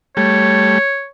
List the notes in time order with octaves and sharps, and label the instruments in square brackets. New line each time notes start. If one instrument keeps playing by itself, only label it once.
[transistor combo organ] G3 A3 [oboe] C#5